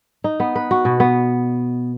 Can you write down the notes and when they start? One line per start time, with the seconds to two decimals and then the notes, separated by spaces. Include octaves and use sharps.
0.24 D#4
0.40 B3
0.55 B4
0.71 F#4
0.85 B2
1.00 B3